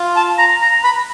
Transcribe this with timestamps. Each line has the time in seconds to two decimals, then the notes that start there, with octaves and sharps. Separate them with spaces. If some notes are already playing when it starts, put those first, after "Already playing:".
Already playing: F4
0.16 A5
0.38 A#5
0.62 A#5
0.84 B5